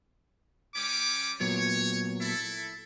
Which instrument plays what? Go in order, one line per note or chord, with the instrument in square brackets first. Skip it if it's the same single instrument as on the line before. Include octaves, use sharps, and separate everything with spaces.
[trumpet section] G3 C#4 D6
[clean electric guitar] A#2 F#3 B3 [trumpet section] C#5
[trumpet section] E4 A4